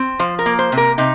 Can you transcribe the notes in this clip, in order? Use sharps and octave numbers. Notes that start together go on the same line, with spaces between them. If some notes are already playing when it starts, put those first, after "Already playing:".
Already playing: C4
F3 C5
A#4
A#3
C5
C3
A#4
C3 D#4